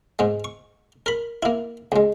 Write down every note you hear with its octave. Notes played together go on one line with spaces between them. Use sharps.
G#2 G#3
C#6
A#4 B5
A#3 E4
C#2 G#3